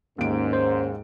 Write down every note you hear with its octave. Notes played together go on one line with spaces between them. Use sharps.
D#2 G#2 A#3 C#4 D7
C5